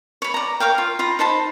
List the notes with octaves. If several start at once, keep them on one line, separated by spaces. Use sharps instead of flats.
C#5 B5
D5 A#5
A#4 C#5 F5 G5
F4
F4 A#5 B5
D#4 C5 A5 B5